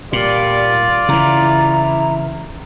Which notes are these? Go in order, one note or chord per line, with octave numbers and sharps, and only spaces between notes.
A#2 G3 F4 D5
C#3 E3 E4 A#5